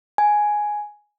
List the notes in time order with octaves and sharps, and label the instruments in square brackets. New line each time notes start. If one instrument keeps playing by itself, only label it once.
[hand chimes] G#5